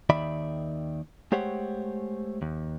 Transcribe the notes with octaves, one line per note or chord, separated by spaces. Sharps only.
D#2 D#3 D5 E5 B5
G#3 A3 G4 C5 C#5 F#5
D#2